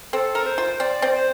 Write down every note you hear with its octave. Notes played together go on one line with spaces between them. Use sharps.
C4 A4
A#4
C5
F4
C4 D5
C4
C5